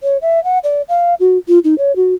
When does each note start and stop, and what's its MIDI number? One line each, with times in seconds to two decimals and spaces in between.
0.03 0.17 73
0.22 0.43 76
0.44 0.58 78
0.64 0.82 74
0.89 1.14 77
1.20 1.38 66
1.48 1.59 65
1.64 1.75 63
1.78 1.92 73
1.96 2.14 66